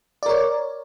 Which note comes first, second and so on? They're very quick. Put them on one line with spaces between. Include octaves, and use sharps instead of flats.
D5 A#4 C#5